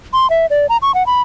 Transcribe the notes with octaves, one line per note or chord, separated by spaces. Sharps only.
C6
E5
D5
A#5
C#6
F#5
B5